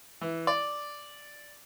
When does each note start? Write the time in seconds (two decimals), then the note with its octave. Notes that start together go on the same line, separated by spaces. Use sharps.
0.21 E3
0.47 D5